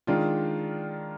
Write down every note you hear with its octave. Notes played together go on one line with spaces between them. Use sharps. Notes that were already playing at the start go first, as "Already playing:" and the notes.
D#3 G#3 D4 F4